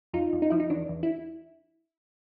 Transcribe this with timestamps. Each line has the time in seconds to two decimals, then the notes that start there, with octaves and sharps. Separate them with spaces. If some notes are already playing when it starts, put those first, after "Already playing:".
0.13 F2 D#4 F4
0.33 F2
0.42 D#4
0.50 F3 E4
0.60 D#4
0.70 E2 D4
0.89 E2
1.03 E4